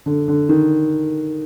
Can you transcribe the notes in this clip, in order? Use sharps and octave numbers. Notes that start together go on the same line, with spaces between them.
D3
D3
D#3